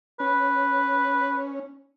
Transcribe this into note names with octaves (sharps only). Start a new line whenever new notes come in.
C#4 B4